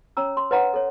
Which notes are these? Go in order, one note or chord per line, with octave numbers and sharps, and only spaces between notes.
C#4 C#5 A#5 E6
C6
B4 C#5 D#5 F#5 A#5
A4 C#5